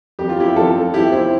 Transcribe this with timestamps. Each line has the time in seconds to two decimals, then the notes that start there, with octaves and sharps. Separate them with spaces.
0.19 F2 G4
0.29 F4
0.40 E4 G4
0.56 F2 F4 A4
0.93 F2 E4 G4
1.12 C4 E4